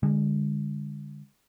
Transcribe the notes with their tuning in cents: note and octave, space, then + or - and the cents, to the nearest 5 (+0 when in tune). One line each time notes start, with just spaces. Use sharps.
D3 +0 G#3 -30